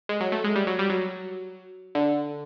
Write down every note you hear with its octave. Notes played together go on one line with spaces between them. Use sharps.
G#3
F#3
A3
G#3
G3
F#3
G3
F#3
D3